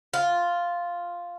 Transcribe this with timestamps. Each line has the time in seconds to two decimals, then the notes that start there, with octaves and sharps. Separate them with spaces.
0.14 F4